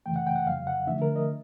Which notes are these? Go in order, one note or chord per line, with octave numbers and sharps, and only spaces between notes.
F#2 C#3 E3 A3 G5
F#5
G5
F#5
F2 C#3 F#3 F5
F#5
D3 F3 A3 D4 E5
A#4
D#5